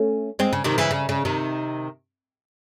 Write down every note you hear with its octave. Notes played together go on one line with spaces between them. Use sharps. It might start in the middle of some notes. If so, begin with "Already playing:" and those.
Already playing: A3 C#4
G#3 C4
C#3
C3 D#3
C#3 E3
C#3
C#3
C3 D#3